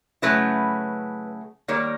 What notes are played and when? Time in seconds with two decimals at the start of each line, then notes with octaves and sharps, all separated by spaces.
0.22 C#3 F#3 A3 C#4 E4 B4
1.68 D#3 G3 A#3 C#5